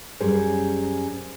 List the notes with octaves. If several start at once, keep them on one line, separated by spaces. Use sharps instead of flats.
F#2 G3 C#4 G#4 C5